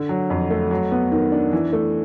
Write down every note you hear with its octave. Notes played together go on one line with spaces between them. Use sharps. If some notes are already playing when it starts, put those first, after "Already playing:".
Already playing: D3
F#3
F2
A3
F#3
B3
D#3
D4
E3
A3